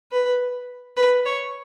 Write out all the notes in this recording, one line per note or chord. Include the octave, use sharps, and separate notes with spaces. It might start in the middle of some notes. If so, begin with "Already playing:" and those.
B4
B4
C#5